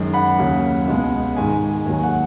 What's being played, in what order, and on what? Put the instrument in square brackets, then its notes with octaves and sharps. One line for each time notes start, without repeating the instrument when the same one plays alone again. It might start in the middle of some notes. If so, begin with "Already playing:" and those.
Already playing: [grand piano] F#2 D#3 G#3
F#5 B5
D#2 C#3 F#3
C#2 B2 G#3
G#2 D#3 G#3 G#5
G#5
D#2 D#3 F#3 G#5
F#5